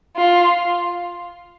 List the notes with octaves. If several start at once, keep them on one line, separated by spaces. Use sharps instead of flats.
F4